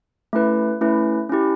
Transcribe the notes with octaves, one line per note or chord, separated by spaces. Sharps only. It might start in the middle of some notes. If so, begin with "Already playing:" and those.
A3 C#4 E4 B4
A3 C#4 E4 B4
C#4 E4 G4